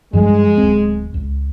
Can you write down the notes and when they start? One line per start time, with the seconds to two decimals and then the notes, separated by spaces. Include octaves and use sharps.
0.13 G2 F3 G3 G#3
0.58 D1 C4
1.14 C#2